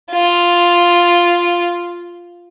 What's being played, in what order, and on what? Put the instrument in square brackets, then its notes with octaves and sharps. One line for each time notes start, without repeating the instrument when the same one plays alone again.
[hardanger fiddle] F4